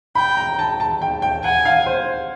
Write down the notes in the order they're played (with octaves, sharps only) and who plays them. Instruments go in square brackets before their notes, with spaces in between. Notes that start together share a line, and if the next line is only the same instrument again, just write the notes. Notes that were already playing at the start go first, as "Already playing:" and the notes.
[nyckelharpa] G5 [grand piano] B5
[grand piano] A#5
A5
A5
G5
G5
[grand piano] F#5 [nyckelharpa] G#5
[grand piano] F5
C5